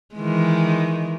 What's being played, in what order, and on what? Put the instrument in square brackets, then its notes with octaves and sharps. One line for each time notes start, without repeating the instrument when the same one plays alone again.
[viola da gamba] D#3 E3 G#3